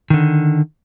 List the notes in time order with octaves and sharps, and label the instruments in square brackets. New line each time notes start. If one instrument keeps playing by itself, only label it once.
[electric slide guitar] D3 D#3